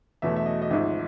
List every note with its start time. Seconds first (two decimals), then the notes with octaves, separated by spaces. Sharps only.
0.22 E2 B2 F#3 A3 E5
0.36 E5
0.46 D#5
0.62 D#5
0.70 G#1 G#2 F3 E5